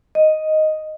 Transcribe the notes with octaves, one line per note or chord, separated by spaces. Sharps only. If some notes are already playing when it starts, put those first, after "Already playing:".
D#5